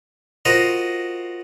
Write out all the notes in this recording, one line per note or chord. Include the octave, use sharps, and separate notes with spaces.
F4 F#4 A#4 C5 D#5